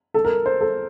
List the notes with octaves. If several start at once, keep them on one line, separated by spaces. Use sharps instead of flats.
A4
A#4
C5
A4